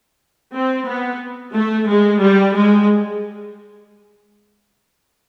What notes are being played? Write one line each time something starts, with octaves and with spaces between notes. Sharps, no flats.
C4
B3
A3
G#3
G3
G#3